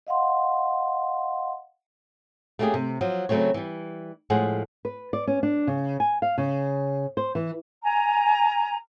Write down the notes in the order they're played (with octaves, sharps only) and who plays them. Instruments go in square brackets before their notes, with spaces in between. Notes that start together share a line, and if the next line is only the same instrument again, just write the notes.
[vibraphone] D#5 F5 F#5 C6
[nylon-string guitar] A3 A#3 C#4 D#4 G4 G#4
C3
F3 F#3
C#3 F#3 A3 C4 C#5
E3 G3
A2 F3 G#3 G#4 F#5
B4
D5
C#4
D4
C#3
G#5
F5
C#3
C5
E3
[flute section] G#5 A#5